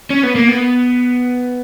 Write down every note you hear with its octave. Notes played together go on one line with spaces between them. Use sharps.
C#4
B3
A#3
B3